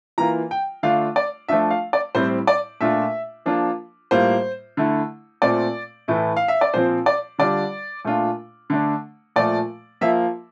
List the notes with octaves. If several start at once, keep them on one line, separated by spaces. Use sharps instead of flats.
E3 A#3 F4 A#5
G5
D3 A3 D4 F4 F5
D5
F3 A3 D4 F4 E5
F5
D5
A2 G3 C4 E4 C5
D5
A#2 A3 D4 F4 E5
F3 A#3 D4 F4
A2 G3 A#3 F4 C5
D3 A3 E4
A#2 A3 C4 D5
A2 E3 A3 E4
F5
E5
D5
A#2 F3 C4 C5
D5
D3 G3 D4 F4 D5
A#2 A3 D4 F4
D3 A3 D4
A#2 F3 A3 D5
F3 A#3 F4 E5